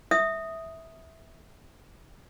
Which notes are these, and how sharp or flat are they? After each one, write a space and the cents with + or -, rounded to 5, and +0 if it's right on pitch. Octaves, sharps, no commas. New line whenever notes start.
E5 -15 D#6 +0